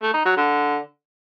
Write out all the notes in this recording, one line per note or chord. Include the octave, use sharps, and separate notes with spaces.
A3
D#4
F#3
D3